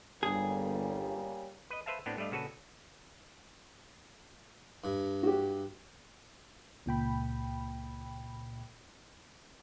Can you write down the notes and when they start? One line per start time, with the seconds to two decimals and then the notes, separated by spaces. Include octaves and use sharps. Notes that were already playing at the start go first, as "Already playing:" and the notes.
0.23 G1 C#3 G3 A#3 G#4
1.70 B4 D#5
1.86 B4 C5 E5 F5 A5
2.06 A2 B3 C4 D4
2.17 G2 A3 D5 D#5 F5
2.31 A#1 C#3 F#4 A4 B4
4.84 G2
5.23 F#4 G4
6.86 C#2 A#2 G5 B5